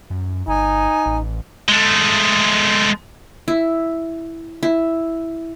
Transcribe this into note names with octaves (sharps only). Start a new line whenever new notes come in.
F#2
G1 D#4 G#5
A1
G#3 A3
E4
E4